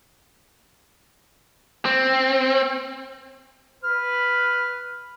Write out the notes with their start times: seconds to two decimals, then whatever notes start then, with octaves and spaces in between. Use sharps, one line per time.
1.85 C4
3.84 B4 F6